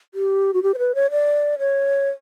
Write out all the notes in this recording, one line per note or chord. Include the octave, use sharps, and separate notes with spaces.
G4
F#4
G4
C5
B4
C#5
D5
C#5